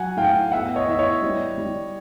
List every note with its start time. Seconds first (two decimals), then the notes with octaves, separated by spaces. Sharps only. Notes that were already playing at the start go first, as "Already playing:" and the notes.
Already playing: F#3 F#5 G#5
0.17 A2 F5 G5
0.52 B3 E5 F#5
0.76 C#5 D#5
0.87 E3 E5
0.99 C#5 D#5
1.22 G3
1.58 G3